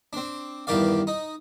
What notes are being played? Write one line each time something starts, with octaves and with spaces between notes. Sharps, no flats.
C4 D4
E2 G2 D#3 G4 D5 F5
D#4